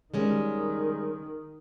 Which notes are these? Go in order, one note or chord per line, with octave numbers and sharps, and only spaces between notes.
D#3 G3 G#3 C#4